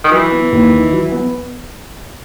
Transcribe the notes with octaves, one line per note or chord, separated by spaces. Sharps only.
D#3
E3 F#3
B3
D#2
D#3
F#3
B3